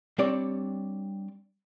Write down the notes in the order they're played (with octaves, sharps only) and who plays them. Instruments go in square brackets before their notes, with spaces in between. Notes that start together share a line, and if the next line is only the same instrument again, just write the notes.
[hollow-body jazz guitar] G3 C4 D4 C#5 D5